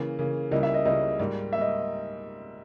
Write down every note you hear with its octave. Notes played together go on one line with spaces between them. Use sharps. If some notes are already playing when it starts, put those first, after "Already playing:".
Already playing: C#3 E3 A#3
C#3 E3 A#3
C#2 C#3 G3 A#3 E4 D#5
E5
D#5
C#2 C#3 G3 A#3 E4 D#5
G#2 G3 A#3
G3 A#3 E5
D#5